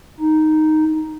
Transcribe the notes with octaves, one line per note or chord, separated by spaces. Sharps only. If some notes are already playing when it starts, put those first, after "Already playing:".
D#4